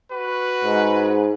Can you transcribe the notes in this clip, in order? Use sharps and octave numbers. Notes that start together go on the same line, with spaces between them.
F#4 B4
G#2